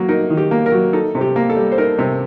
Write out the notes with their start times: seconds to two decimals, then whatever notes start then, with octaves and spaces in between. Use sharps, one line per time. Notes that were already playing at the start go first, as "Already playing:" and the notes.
Already playing: F#3 A#3
0.09 D#4 A#4
0.30 D#3
0.37 G4
0.51 A#3
0.66 A#4
0.72 F#3
0.93 D#4 A4
1.15 C3
1.21 G4
1.36 A#3
1.50 A4
1.56 G3
1.72 C5
1.78 D#4 A#4
1.99 C3